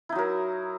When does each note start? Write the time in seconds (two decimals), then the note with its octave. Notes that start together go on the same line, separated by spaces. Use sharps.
0.09 E4
0.12 D#4
0.15 F#3
0.18 A#4